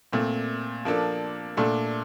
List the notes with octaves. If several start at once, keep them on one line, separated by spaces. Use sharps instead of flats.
A#2 A3 C4
F3 A#3 D4 A4
A#2 A3 D4 A4